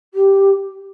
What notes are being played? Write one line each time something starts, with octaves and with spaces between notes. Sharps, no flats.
G4